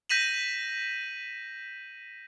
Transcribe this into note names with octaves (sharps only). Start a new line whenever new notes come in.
G6 A#6 B6 D#7 E7 F#7